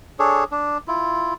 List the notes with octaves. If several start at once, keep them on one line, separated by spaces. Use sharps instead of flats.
D4 G#4 A4 C#5
D4
E4 F4